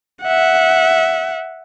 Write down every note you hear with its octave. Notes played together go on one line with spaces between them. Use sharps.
E5 F#5